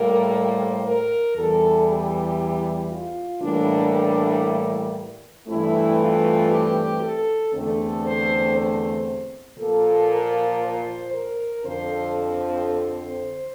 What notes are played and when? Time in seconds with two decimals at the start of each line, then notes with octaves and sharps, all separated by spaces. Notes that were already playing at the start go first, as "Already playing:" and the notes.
Already playing: A2 G3 A#3 A#4
0.33 C5
0.85 A#4
1.36 E2 E3 G3 A4
1.87 G4
2.90 F4
3.41 A2 E3 G3 A#3 D4
3.93 D4
5.47 G2 E3 A3 C4 E4
5.98 F4
6.50 G4
7.01 A4
7.53 E2 D3 A3 C4 A4
8.04 C5
8.56 C5
9.58 A#2 F3 A#3 A4
10.10 A#4
10.62 C5
11.12 A#4
11.63 F2 D3 F3 C4 C5
12.66 C5